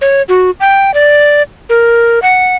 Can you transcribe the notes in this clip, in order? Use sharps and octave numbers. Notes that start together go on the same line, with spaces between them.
C#5
F#4
G5
D5
A#4
F#5